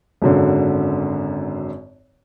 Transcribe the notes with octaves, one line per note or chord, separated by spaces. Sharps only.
G#1 F#2 D3